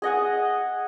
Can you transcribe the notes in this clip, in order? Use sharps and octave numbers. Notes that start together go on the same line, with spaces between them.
G#4 D#5 F#5 G#5